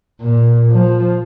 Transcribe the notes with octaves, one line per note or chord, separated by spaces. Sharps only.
A#2
F3